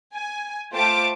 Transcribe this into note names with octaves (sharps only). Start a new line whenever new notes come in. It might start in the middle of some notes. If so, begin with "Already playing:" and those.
G#5
A3 F4 C5 G5 A5 D6